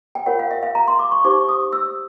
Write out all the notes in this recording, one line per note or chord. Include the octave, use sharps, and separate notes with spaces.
G5
F4 A#4 C#5 F#5
F5
E5
F5
A#5
C6
D6
C#6
D#4 G4 C5 D6
D#6
E6